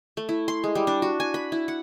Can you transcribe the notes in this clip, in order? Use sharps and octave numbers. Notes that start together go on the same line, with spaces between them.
A3
E4
C6
G#3
G3
D4
F#4
G#5
B5
E4
F#5